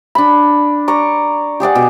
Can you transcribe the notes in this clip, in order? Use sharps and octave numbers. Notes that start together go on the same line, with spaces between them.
D4 B5
D5 A#5 C#6
G4 G#4 D5 F#5
B2